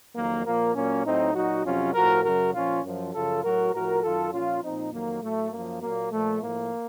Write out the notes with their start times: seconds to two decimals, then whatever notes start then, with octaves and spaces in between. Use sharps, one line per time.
0.16 F2 D#3 F#3 A#3
0.45 A#2 F3 A#3
0.75 A#2 F#3 A#3 C#4
1.05 A2 F#3 C4 D#4
1.34 A#2 F#3 D#4 F#4
1.64 F2 C3 F#3 C#4 F4
1.94 A2 F3 F#4 A#4
2.24 F#2 C#3 F#3 F#4 A#4
2.54 A#2 F3 C#4 F4
2.83 F#2 F3
3.13 F#2 C#3 F3 F4 A4
3.43 A2 F#3 F#4 A#4
3.73 A2 F3 F#4 A#4
4.02 F#2 D#3 F#3 F4 A4
4.32 A#2 F3 C#4 F4
4.62 A#2 F3 C4 D#4
4.92 F2 D#3 F#3 A#3
5.22 A2 F#3 A3
5.51 F#2 F3 A#3
5.81 A#2 F#3 A#3
6.11 A#2 F3 A3
6.41 A2 F3 A#3